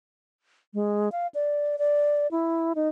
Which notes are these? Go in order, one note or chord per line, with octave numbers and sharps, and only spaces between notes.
G#3
F5
D5
D5
E4
D#4